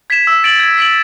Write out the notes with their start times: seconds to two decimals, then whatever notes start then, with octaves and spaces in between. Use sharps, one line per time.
0.10 G#6 B6 E7
0.27 E6
0.44 A6 D7 F#7
0.60 G#6
0.78 B6 D7 F#7